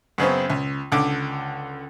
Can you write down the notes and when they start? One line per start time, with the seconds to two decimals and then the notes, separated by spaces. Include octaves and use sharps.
0.18 F#2 C#3 B3 C4
0.50 C#2
0.92 C#2 D3 D6